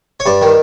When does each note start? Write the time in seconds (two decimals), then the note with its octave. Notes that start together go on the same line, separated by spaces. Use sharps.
0.20 C#5
0.26 G2 D5
0.42 D#3